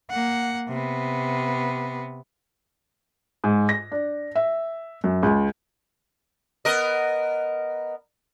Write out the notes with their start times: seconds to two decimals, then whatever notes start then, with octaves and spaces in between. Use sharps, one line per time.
0.10 A#3 F#5
0.68 C3 B3
3.44 G#2
3.69 A#6
3.92 D4
4.35 E5
5.04 F#2
5.23 C#2
6.65 B3 A#4 D#5